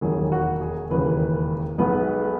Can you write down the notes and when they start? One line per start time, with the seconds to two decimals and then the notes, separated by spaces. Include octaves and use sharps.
0.01 E1 D#2 D#3 F#3 G#4
0.32 F#4
0.61 G#4
0.90 E1 D#2 C#3 E3 G#3 B4
1.78 B1 B2 G#3 B3 D#4 B4